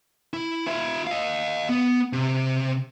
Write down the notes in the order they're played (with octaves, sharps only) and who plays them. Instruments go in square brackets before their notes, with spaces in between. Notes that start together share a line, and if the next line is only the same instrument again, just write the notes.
[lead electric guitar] E4
F4 E5
D#5 F5
B3
C3